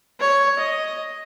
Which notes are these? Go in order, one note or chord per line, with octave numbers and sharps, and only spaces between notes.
C#5
D#5